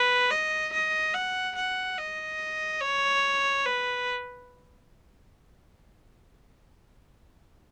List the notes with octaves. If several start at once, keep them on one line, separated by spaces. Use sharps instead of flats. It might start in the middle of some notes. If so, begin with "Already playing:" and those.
Already playing: B4
D#5
D#5
F#5
F#5
D#5
C#5
B4